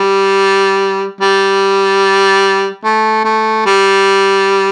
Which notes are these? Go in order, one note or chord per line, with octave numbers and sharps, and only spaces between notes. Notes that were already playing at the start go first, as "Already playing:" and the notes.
Already playing: G3
G3
A3
A3
G3